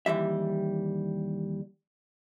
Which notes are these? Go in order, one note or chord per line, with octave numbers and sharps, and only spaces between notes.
D#2 E3 G3 E5